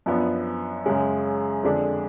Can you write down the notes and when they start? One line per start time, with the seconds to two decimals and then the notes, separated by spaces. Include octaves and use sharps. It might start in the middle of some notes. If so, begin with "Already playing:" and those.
0.06 F#2 F3 B3 D4
0.85 F#2 C#3 G#3 C#4
1.63 F2 D3 G#3 D4